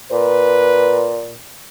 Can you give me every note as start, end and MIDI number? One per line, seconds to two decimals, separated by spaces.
0.12 1.36 46
0.12 1.13 71